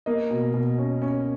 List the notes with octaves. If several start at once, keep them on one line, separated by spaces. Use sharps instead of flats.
A#3 D#5
B2
B2
C#4
C#4